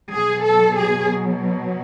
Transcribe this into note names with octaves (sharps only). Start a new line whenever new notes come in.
B2 F#3 G#4
A4
G#4